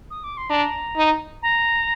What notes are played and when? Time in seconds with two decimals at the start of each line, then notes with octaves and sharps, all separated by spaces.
0.11 D#6
0.24 D6
0.37 C6
0.50 D4 A#5
0.96 D#4
1.43 A#5